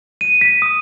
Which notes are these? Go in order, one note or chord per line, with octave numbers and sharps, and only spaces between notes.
D#7
B6
D#6